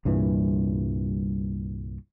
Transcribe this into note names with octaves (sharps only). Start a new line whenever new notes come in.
C2 G2 A#2 E3